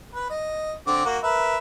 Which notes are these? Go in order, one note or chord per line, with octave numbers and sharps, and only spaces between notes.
B4
D#5
D3 C4 D6
A#3 F#4
A#4 B4 E5